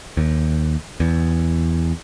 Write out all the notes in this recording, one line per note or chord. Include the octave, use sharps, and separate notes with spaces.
D#2
E2